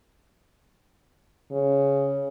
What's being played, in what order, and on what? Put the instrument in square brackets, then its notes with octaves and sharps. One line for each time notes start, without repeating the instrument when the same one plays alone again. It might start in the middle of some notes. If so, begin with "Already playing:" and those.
[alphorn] C#3